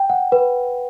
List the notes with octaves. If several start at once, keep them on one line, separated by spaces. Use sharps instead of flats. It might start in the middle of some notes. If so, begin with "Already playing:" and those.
Already playing: G5
F#5
B4